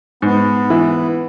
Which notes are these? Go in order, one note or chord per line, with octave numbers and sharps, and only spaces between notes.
G#2 B3
E3